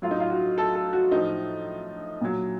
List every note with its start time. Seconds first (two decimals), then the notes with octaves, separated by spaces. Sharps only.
0.02 A2 F#3 F4
0.11 D#4
0.20 F4
0.30 F#4
0.58 A4
0.75 A4
0.93 F#4
1.11 A2 F3 D#4
2.21 A#2 F#3